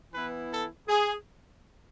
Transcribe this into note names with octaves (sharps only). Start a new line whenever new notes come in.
E3 B3 E4 B4
A4
G#4